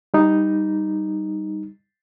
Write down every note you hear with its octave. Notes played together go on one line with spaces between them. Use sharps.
G3 D#4